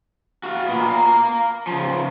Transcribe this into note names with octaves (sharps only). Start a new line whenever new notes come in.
F#4 F5
A#2 B3
F5 A#5
C#3 F3